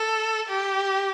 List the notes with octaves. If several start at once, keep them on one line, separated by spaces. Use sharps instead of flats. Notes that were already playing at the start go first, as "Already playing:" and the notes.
Already playing: A4
G4